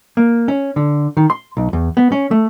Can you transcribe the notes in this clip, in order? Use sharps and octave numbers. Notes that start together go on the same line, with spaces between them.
A#3
C#4
D3
D#3
C6
B1
E2
B3
C#4
A3